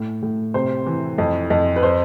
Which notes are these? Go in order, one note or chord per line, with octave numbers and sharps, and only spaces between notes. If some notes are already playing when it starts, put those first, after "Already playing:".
Already playing: A2
A2
C3 C5
E3
F2
F2
B4
C5